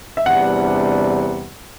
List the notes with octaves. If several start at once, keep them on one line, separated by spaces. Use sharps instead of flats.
E5
E2 C3 G3 D4 F#5